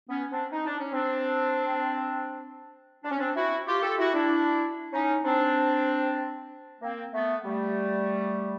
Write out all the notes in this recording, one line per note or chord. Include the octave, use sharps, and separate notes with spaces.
B3 C#4
C4 D4
D#4
D4
C#4
C4 D4
D4
C#4
C4 D4
E4 F#4
F4 G4
G4 A4
E4 F#4
D4 E4
C#4 D#4
C4 D4
A#3 C4
A3 B3
G3 A3